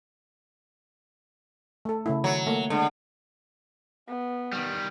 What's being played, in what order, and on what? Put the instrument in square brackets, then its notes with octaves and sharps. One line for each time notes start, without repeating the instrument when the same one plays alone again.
[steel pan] A3 A4
C#3 A3 E4
[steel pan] D#3 [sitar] F#3
[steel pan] A3 A#3
[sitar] D3 [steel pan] G#3
[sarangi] B3
[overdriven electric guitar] D#3 G3